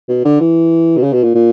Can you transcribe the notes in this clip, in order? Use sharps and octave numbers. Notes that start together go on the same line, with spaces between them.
B2
D3
E3
B2
C#3
B2
A#2
A#2